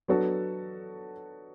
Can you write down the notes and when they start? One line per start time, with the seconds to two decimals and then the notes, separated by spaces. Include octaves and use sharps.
0.08 F#3 B3 D4 F#4 A4